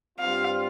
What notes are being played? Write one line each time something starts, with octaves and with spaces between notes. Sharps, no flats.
G2 G3 C4 F4 F5